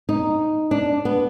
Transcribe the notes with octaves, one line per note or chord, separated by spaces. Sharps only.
D#4
D4
B3